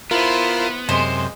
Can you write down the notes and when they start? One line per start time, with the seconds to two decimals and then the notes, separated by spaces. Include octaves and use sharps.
0.11 B3 E4 F4 A#4 C5
0.89 F#2 C3 G#3 C5